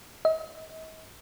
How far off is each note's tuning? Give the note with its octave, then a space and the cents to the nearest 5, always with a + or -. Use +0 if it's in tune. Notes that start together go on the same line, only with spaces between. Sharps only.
D#5 +45